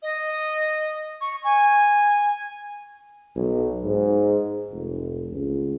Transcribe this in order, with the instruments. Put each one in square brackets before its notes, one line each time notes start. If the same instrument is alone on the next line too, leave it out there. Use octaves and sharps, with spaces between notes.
[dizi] D#5
C#6
G#5
[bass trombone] B1
G#2
F1
C#2